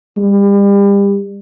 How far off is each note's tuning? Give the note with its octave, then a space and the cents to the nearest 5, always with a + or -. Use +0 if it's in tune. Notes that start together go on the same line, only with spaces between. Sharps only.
G3 +35